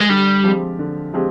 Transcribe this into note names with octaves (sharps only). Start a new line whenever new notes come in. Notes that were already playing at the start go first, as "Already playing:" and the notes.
G#3
D3 G3
F3 G#3 C4 G4
D3
F3 G#3 C4 G4